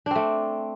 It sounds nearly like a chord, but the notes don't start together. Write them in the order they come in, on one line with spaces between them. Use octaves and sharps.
D4 C4 A3